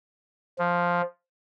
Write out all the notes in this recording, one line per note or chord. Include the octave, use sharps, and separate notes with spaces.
F3